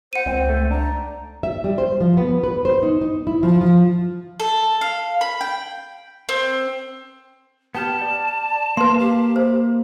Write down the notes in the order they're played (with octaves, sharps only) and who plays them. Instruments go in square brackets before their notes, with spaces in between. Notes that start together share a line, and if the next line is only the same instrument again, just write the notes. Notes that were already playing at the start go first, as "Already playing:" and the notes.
[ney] C5 [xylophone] F#5 D#7
[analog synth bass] C#2 [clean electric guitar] C4 [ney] C5
[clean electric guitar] A3
[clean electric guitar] D4 [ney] A#5
[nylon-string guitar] E5
G3
C5
F3
B3
B4
C5
D#4
D#4
E4
F3
F3
[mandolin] A4
F5
B5
G5
C4
[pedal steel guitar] B3 G4 F6 [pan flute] A5
[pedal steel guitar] D5
[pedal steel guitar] A#3 F5 [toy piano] B4 C6
[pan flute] G4
[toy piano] C5